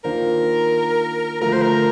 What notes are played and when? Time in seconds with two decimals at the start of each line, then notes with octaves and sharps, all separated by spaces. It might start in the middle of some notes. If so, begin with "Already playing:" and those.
0.04 D#3 A#3 D4 F4 A#4 C5
1.42 D3 F3 A3 A#4
1.52 C5
1.62 A#4